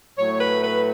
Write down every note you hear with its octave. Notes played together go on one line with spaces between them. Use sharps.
A2 F#3 A3 C#5
B4
B4